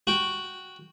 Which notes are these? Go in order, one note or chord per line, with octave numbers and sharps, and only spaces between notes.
F#4 G5